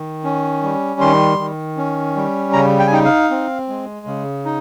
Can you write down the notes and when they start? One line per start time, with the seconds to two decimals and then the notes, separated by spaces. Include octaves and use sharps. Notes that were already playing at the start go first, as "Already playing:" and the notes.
Already playing: D#3
0.24 C#4
0.63 G3
1.01 D#3 C6
1.38 D#3
1.77 C#4
2.16 G3
2.53 C#3 A#5
2.79 G5
2.87 G#5
2.92 D#4 G5
3.05 F5
3.30 C4
3.69 G#3
4.07 C#3
4.45 D#4